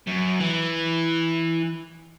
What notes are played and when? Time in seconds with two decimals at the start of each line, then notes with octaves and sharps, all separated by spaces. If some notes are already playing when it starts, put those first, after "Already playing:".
0.07 F#2
0.40 E3